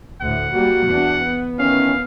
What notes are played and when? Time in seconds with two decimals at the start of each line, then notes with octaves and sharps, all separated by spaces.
0.22 D2 A2 F#5
0.53 G3 A#3 F#4
0.87 E2 D4
1.24 B3
1.59 D#3 E3 C#4 F5